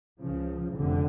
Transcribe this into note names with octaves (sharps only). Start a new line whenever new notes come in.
C#2 C#3 F3
F1 F2 D3